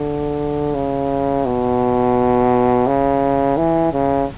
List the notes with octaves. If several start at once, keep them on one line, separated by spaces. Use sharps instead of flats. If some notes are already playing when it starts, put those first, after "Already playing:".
Already playing: D3
C#3
B2
C#3
E3
C#3